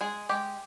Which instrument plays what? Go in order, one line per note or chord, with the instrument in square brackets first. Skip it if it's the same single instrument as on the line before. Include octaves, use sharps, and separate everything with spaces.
[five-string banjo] G#3 G#4
G#3 G4